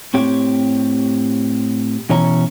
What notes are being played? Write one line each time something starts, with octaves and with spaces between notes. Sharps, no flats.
A2 C4 G4 C#5
B2 E3 C#4 C#5 A#5